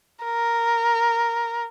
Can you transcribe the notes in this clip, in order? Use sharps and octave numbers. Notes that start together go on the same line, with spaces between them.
A#4